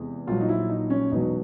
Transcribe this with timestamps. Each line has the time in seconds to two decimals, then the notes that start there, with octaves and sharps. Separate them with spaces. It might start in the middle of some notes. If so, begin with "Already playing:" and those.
Already playing: E2 C3 E3 G#3
0.27 A#1 A#2 F#3 F4
0.41 D#4
0.49 E4
0.70 D#4
0.90 C#4
1.12 E1 E2 B2 F#3 D#4